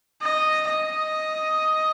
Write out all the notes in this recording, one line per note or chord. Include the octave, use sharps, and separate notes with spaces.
D#5
D#5